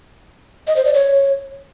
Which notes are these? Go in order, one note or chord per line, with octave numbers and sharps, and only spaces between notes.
D#5
C5
D5
C#5